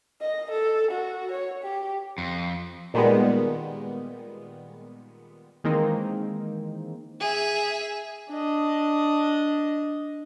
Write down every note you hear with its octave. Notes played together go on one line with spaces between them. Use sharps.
D#5
A4
F#4
C#5
G4
F2
A#2 D#3 G3 G#3 B3
D#3 E3 G#3 A#3 C4 D#4
G#4 E5
D4 D#5